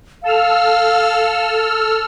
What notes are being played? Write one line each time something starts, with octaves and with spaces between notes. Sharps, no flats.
A4 F5 E6 F6